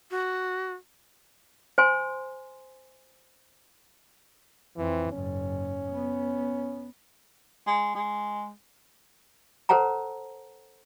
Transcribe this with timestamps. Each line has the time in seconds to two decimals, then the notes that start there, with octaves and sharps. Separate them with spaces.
0.11 F#4
1.78 C5 G#5 C6
4.77 F2 E3 C4
5.12 F#1 G#2 C#4
5.91 B3
7.67 G#3
7.95 G#3
9.69 A4 B4 C5 F#5 A5 A#5